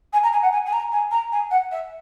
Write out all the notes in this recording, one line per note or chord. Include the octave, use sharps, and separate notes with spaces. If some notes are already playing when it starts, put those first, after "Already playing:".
G#5
A#5
G#5
F#5
G#5
G#5
A#5
G#5
A#5
G#5
F#5
E5